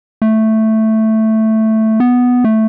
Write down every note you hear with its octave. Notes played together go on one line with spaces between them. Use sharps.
A3
B3
A3